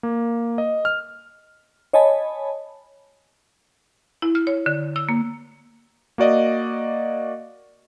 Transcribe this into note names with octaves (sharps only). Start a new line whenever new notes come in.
A#3
D#5
F6
C#5 D#5 G#5 A5 B5
E4
F6
C#5
D3
E6
A#3
A#3 F#4 D5 D#5